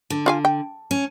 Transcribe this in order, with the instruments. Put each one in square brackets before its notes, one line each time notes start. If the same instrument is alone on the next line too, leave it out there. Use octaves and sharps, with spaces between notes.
[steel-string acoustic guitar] D3
[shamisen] F4 F5 G#5
G5
[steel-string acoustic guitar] C#4